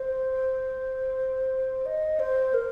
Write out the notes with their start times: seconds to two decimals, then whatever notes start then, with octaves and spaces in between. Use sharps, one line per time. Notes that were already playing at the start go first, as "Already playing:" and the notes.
Already playing: C5
1.86 D#5
2.19 C5
2.54 A#4